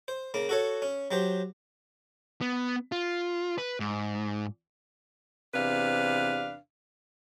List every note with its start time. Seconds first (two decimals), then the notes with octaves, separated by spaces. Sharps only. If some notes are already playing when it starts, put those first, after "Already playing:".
0.08 C5
0.34 C#3 A#3
0.49 F#4 A4 C#5
0.82 C#4
1.11 F#3 G4 C5
2.41 B3
2.92 F4
3.58 B4
3.80 G#2
5.54 E2 C3 D4 B4 F5